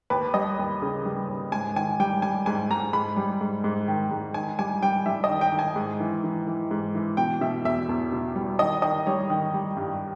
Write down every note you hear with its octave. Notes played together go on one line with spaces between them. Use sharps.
D#2 B4
G3 D#5
D#2
C#3
G3
D#2
G#2 G#5
D#3 G#5
G3 G5
G3 G#5
G#2 G#5
G#2 A#5
G#2 B5
G3
G#2
G#2
D#3
G#2
D#3 G#5
G3 G#5
G3 G5
G3 E5
D#5
D#3
G5
D#3
G#5
G#2
E3
E3
E3
G#2
E3
B2 G5
B2 E5
E2 E5
E2
B2
G3
D#3 D#5
D#3 D#5
G3 C#5
D#3
G3
G2